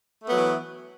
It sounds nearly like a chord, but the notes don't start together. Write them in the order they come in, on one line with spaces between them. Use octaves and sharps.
A3 B3 F#3 E3